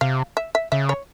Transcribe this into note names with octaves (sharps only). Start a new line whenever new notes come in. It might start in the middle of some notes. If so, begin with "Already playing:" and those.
C3 F5
E5
E5
C#3 E5
C#5